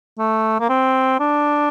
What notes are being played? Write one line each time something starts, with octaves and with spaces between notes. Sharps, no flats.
A3
A#3
C4
D4